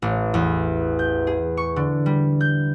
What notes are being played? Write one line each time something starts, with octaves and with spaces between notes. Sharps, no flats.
A1
E2
G6
G#4
C#6
D3
G3
G6